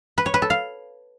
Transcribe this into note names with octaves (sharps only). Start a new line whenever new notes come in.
B4
C#5
B4
A4
F5